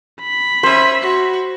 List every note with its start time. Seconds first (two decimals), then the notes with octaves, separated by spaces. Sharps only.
0.21 B5
0.63 C#4 C5 E5
1.02 F#4